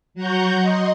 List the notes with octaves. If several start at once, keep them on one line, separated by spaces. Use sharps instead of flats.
F#3 F#5 A#5 C#6 G6
D#5 C6